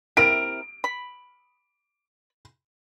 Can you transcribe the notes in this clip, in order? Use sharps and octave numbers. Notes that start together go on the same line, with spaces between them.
C3 E4 A#4 D7
B5